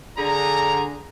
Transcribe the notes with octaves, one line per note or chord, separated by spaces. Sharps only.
D3 G#4 A#5